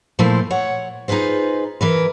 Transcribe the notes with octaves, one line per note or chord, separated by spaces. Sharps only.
A#2 F3 A3 E4 C5
C#5 F#5
D#4 F4 G#4 B4 C5
E3 A#4 B4